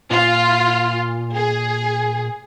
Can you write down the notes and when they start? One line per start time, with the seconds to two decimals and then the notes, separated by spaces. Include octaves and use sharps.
0.11 A#2 F4
1.35 G#4